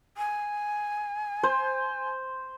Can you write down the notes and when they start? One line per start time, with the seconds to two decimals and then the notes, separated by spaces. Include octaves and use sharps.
0.17 G#5
1.43 C5